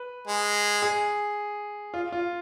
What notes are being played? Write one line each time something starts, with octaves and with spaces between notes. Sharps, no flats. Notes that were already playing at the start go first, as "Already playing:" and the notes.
Already playing: B4
G#3
G#4
F4
F4